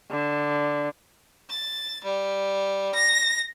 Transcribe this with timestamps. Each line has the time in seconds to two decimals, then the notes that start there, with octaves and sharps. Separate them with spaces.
0.11 D3
1.49 A6
2.03 G3
2.94 A#6